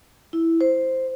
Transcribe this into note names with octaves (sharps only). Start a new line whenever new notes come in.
E4
C5